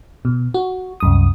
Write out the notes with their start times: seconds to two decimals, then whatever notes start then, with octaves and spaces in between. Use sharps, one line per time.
0.25 B2
0.54 F#4
1.00 C2 F#2 D#6